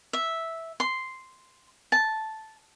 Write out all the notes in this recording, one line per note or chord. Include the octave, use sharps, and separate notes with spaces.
E5
C6
A5